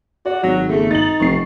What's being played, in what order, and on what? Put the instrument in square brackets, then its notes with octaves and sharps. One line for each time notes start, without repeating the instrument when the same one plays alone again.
[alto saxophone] F#4 [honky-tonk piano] D5
[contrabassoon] G#1 [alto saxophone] F#3 [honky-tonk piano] A#6
[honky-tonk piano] C#3 A#3 A4 [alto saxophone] A3
[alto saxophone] D#4 [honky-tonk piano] A6 F#7
[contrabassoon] F1 [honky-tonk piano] C#6 C7